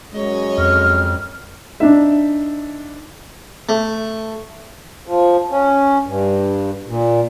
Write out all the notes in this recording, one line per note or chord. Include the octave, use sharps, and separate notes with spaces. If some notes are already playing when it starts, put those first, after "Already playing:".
F#2 G#3 C#5 D#5
F2 F6
D4 D#4 E5
A3
F3
C#4
G2
A#2